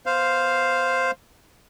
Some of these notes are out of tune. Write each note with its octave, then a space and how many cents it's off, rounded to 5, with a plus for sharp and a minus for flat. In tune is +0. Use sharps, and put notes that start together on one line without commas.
B3 +0 C5 +0 F5 +0